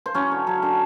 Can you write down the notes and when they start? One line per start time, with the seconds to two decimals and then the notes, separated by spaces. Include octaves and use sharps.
0.06 C5
0.14 F#3 C#4 C#5
0.31 D3
0.47 F#3
0.63 D3